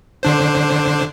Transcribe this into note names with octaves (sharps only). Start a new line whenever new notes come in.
D3 D4 C5